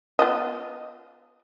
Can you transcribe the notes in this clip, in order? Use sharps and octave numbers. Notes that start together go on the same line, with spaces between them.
B3 F4 D#5